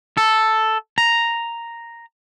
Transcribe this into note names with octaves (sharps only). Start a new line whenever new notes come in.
A4
A#5